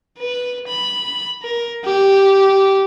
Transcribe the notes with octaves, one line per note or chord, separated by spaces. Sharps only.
B4
B5
A#4
G4